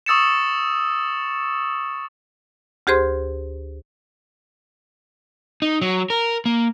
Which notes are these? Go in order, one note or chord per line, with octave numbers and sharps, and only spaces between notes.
C#6 D#6 E6 A6 C#7 E7
D2 G4 G#4 C5 C6
D#4
F#3
A#4
A#3